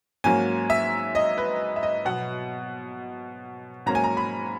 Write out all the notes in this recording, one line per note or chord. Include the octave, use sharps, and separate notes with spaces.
G#2 F#3 A#3 C#4 G#5
E5
D#5
B4
E5
D#5
B2 F#3 B3 F#5
G#2 F#3 A#3 C#4 A#5
G#5
A#5
B5